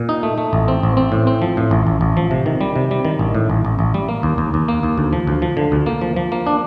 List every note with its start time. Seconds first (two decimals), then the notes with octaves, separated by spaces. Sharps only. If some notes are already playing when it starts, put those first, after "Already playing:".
Already playing: A#2
0.09 D#4
0.23 A3
0.38 A3
0.53 A1
0.68 C4
0.83 A1
0.97 C4
1.12 A2
1.27 C4
1.42 F3
1.57 A2
1.71 A1
1.87 A1
2.01 A1
2.17 F3
2.31 C3
2.46 D#3
2.61 G3
2.76 C3
2.91 G3
3.05 D#3
3.19 A1
3.35 A2
3.50 A1
3.65 A1
3.79 A1
3.94 G3
4.09 A#3
4.23 D#2
4.38 D#2
4.54 D#2
4.68 A#3
4.83 D#2
4.98 D2
5.13 F3
5.27 D2
5.42 F3
5.57 D3
5.72 D2
5.86 A#3
6.02 F3
6.16 F3
6.32 A#3
6.47 D4